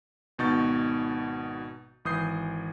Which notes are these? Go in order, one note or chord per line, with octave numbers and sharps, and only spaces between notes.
G#1 B2 D#4 C#6 G6 A6
G#1 E3 D#6 G6 C7